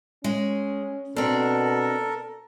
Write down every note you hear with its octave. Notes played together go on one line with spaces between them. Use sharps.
G#3 C#4
B2 C4 D4 A4 A#4